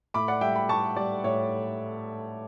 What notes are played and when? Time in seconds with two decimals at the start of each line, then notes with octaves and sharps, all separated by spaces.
0.14 A2 B5 D6
0.28 D5 F#5
0.41 G3 E5 G5
0.55 G5 B5
0.69 A2 A5 C#6
0.96 G3 D5
1.24 A2 C#5